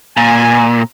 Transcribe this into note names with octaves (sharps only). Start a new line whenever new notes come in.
A#2 G#5